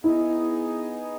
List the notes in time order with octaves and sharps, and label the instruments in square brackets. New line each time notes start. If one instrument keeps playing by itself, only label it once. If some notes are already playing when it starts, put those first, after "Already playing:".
[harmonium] B3 D#4 G#4 D#5 [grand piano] E4